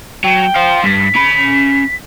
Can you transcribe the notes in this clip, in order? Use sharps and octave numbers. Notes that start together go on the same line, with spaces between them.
F#3 G5
C5 F5
G2 B6
C#4 B5